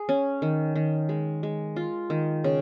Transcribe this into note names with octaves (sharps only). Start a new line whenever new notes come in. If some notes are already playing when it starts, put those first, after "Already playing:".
Already playing: G#4
C#4
D#3
D#3
G#3
G#3
F4
D#3
C#3